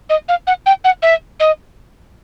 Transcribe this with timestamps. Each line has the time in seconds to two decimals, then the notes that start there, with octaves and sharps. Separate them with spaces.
0.09 D#5
0.29 F5
0.47 F#5
0.66 G5
0.84 F#5
1.02 E5
1.40 D#5